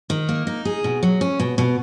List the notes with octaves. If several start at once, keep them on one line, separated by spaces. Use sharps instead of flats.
D#3
A#3
D#4
G#4
B2
F#3
C#4
B2
B2